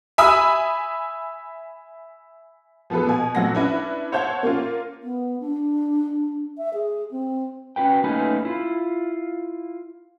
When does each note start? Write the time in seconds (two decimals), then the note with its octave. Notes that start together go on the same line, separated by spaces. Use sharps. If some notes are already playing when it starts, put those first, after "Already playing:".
0.18 E5 G#5 B5 D#6 E6
2.90 F3 B3 G#4 A4 B4
3.07 B2 G#5
3.35 A#1 F#3 A3 C4 F#5 A#6
3.55 C#4 D4 E4 B4
4.12 C5 C#5 E5 F#5 A5 G6
4.43 A#3 C#4 F4
5.03 B3
5.40 D4
6.58 E5
6.74 G#4
7.11 C4
7.76 C#4 F#4 B4 G5
8.04 A3 A#3 C#4 D#4 B4 G#5
8.45 E4 F4